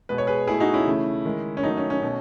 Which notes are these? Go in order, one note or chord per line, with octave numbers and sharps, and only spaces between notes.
B2 G#3 B4
C#5
G#4 B4
B2 A3 E4 G#4
D#4 F#4
C#4 E4
C#3 E3 A3
D#3 G#3
C#4
D#3 F#3 A3 D#4
C#4
C#4
B2 A3